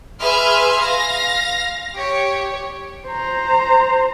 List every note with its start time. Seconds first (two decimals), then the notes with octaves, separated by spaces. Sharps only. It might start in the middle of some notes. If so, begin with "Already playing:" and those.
0.20 G#4 B4 E5 C6 F6
0.82 F5 A#6
1.96 G4 C#5
3.07 C5 A#5